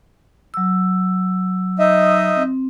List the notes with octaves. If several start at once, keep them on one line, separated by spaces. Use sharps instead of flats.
F#3 E6
D#4 D#5 E5
C4